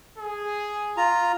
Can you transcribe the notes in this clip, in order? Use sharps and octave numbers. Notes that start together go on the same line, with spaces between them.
G#4
F4 A#5